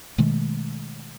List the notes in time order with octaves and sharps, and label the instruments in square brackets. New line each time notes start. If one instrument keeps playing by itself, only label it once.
[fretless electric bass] B2 D#3 G#3 A3